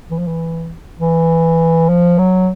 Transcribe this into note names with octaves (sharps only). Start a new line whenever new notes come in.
E3
F3
E3
E3
F3
F#3